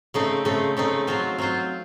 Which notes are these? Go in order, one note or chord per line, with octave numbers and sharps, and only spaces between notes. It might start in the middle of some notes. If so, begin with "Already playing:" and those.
C#3 A3 C4 D#4
C#3 A3 C4 D#4
C#3 A3 C4 D#4
F#3 C4 F4 C5
F#3 C4 F4 C5